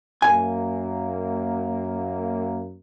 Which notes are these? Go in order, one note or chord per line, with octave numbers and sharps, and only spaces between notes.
F#2 A#3 G#5